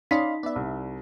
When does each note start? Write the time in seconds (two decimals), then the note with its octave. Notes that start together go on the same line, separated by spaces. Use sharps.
0.11 C#4 D#4 D5 D#5 F5 B5 C6 B6
0.43 B3 D5 E5
0.56 C2